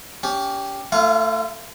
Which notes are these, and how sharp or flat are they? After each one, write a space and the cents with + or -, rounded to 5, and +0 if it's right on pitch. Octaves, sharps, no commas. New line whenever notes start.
C#4 +30 G4 +0
A3 +20 F4 -35 F5 +25